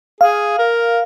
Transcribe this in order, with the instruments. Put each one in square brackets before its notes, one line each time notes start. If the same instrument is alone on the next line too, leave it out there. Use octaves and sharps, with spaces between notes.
[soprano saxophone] G#4 [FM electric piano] F5
[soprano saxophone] A#4